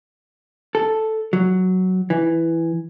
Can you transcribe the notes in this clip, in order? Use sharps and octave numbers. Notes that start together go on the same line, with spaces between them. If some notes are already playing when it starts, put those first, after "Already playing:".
A4
F#3
E3